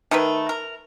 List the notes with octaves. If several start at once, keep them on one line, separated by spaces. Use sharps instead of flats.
D#3 A3 A#4 B4
A#4